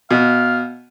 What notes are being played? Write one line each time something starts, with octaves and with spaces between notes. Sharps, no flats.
B2 F5